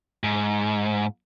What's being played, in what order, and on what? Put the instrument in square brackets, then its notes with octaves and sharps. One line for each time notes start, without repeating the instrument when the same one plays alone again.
[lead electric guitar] G#2